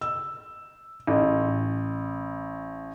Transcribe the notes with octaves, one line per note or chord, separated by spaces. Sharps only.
E6
A1